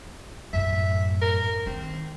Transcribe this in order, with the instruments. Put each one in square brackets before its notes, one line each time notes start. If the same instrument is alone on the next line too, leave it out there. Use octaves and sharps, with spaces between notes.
[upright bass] F#2 A2 [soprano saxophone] E5
[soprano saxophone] A#4
[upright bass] D#3 [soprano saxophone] C4